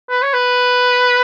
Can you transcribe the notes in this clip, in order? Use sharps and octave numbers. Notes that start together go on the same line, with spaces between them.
B4
C#5
B4